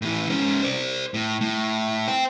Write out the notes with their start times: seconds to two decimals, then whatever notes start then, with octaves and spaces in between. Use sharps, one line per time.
0.02 A2 E3
0.29 G#2 C#4
0.62 C5 D5
1.14 A2
1.41 A2
2.08 C5 G5